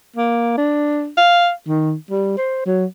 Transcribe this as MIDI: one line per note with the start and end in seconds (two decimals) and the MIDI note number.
0.16 0.54 58
0.57 1.08 62
1.17 1.51 77
1.68 1.94 51
2.10 2.35 55
2.37 2.64 72
2.66 2.85 54